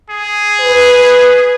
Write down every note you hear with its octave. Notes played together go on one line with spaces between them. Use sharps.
G#4
B4